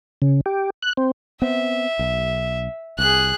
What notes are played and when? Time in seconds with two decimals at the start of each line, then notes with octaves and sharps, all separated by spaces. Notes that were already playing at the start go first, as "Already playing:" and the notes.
0.22 C#3
0.46 G4
0.82 F#6
0.97 C4
1.42 B3 C4 E5
1.99 B1
2.99 C2 G#4 F#6